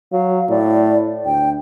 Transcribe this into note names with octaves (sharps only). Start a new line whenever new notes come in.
F#3 F5
A2 D5
D2 G5